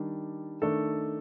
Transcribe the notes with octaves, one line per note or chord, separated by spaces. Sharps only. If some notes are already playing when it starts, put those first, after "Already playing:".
Already playing: D#3 G3 D4
D#3 A3 D4 A4